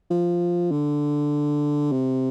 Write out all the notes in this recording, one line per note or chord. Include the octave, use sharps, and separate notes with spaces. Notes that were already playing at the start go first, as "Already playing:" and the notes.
F3
D3
C3